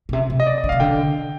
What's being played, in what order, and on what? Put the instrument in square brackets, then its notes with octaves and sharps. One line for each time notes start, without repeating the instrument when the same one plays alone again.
[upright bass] A#2
C3
C3
[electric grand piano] D#5
D5
D#5
[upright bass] D3
[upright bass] C3 [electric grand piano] F5
[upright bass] D3 [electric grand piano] G5